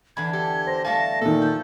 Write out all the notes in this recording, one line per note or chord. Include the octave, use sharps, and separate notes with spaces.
E2 D3 B5 G#6
G4 A4
C5 A#6
G3 A3 F5 A5
A#2 D#3 A4
F3 G6